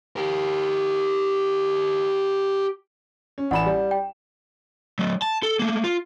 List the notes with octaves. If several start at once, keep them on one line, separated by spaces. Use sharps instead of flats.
G4 A#4
C#4
A1 D5 F#5 B5 E7
G3
G5
F#3 A3
A5
A4
A3 A#3
F4